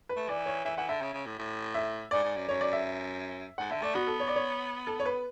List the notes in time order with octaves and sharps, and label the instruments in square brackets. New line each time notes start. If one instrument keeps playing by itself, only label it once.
[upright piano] B4
[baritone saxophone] A3
[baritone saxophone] E3 [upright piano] D5
[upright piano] C#5
[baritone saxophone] E3 [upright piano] E5
[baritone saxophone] E3 [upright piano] F#5
[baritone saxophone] D3 [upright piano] E5
[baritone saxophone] C#3
C#3
A2
A2
[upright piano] E5
[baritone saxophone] G#2 [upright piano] D5
[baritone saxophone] G#2
F#2
[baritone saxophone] F#2 [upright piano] C#5
[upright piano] D5
E5
[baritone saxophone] G#2 [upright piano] F#5
[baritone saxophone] D3 [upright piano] E5
[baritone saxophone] A3 [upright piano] D5
[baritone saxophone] B3 [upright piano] F#4
[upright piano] A4
C#5
D5
C#5
A4
C#5
B4